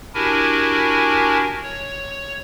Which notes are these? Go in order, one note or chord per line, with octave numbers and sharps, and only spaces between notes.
D4 E4 F#4 G4 A#4 G#5
C#5